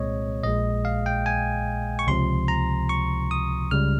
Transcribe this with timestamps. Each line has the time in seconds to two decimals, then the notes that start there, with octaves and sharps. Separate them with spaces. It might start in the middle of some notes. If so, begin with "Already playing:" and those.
Already playing: C2 A#2 G#3 C4 C#5 D#5
0.44 A#1 A#2 G#3 D#5
0.85 F5
1.06 G5
1.26 G#5
1.99 C#6
2.07 C#2 C3 F3 C6
2.48 A#5
2.89 C#6
3.31 D#6
3.71 C#2 C#3 G3 F6